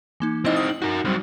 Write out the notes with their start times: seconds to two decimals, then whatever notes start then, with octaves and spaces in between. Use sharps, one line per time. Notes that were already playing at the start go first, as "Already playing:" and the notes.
0.20 E3 A#3 D#4
0.45 C4 D#4 E4 D#5
0.56 D#6
0.69 F#7
0.82 D#4 F#4 A#4
1.05 F#3 G3 C4